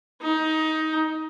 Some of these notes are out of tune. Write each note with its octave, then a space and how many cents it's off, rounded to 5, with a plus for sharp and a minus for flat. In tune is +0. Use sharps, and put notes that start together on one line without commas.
D#4 +15